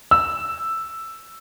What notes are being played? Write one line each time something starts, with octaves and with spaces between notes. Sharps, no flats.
E6